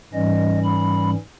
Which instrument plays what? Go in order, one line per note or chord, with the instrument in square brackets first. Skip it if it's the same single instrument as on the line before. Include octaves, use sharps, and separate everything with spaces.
[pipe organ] G#2 E3 G3 C#4 D#5
B5